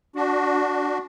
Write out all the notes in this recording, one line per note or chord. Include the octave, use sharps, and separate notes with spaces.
D4 F#4